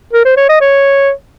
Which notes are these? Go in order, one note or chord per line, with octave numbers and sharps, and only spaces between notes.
A#4
C5
C#5
D#5
C#5